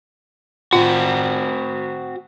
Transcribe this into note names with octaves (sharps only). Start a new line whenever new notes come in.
C4 F4 F#4